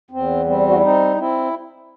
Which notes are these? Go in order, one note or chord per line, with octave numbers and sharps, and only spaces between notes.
E2 C4
G3 C4
F#4
E4
C4 D#4
C4 E4